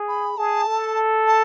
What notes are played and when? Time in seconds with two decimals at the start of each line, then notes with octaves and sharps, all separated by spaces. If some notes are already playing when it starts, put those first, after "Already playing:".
Already playing: G#4
0.08 B5
0.38 G#4 A5
0.67 A4
1.27 A5